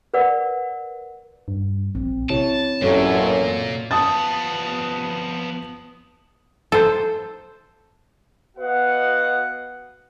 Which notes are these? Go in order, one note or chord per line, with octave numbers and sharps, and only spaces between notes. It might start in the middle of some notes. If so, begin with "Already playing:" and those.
A#4 B4 D5 F#5
G2
A#1 C4
C3 E4 C#5 A5
A1 F#2 A#2 F#4 A4 C#5
F3 B3 A5 D#6 A6
A4 C5
B3 F#4 B4 D#5 F5 F#5